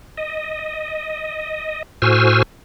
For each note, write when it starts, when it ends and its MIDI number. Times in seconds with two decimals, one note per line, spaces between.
0.17 1.83 75
2.02 2.42 45
2.02 2.42 66
2.02 2.42 72
2.02 2.42 80
2.02 2.42 88
2.02 2.42 89